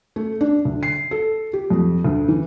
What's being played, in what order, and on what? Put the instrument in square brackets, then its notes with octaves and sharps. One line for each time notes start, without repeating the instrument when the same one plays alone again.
[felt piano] A3
D4
D2
C7
A4
G4
F2
D2
E3